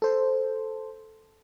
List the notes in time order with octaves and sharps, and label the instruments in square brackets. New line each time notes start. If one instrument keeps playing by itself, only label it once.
[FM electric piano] A4 C5